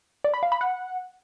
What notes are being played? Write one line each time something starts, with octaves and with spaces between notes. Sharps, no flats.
D5
B5
F5
B5
F#5